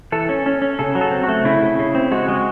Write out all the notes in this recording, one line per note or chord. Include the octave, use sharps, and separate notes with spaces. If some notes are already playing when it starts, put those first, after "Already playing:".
E3 A4
C#4
C#4
C#4
C#3 A4
F#3
A4
C4
F#4
A3
C#3 E4
C#3
C#3
C4
G#3 F#4
G#3